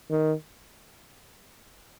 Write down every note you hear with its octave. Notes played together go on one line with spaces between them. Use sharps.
D#3